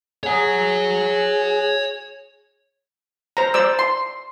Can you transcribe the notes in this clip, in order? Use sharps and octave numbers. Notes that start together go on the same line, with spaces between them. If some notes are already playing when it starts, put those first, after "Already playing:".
G#4 C#5 F#5
C5 A#5
C5 D5 E6
C6